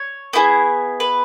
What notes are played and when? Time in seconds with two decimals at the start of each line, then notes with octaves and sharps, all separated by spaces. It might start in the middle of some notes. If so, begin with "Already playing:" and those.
Already playing: C#5
0.33 B3 E4 G#4
1.00 B4